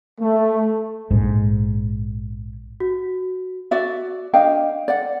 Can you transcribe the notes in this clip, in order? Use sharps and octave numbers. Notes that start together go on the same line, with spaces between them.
A3
A#1 G#2
F#4
F#4 D5 E5
D4 D#5 F5 G5
D5 F#5